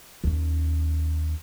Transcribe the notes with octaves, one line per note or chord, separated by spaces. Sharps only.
D#2 C#4